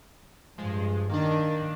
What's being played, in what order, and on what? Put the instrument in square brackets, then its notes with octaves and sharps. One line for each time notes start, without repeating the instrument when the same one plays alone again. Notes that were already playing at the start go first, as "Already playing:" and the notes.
[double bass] G2 [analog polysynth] F3 G#3
[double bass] D#3 [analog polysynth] A#3 D4